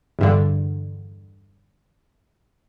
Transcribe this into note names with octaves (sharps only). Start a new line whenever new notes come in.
E2 G2 D3